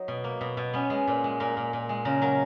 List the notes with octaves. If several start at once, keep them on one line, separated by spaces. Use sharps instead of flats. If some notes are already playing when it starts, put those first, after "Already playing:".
Already playing: F#3 D#4
B2
A#3
B2
B2
B3 C#4
G#3
A#2
G#3
A#2 A#4
A#2
A#2
G#3
C#3 A#4
F#3 A#4